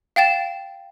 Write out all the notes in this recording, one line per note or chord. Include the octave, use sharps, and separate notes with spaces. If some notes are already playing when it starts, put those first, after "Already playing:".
F5 G5 A6 E7